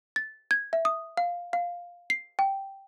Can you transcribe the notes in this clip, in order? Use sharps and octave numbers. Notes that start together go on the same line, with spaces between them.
A6
G#6
E5
D#6
F5
F5
C7
G5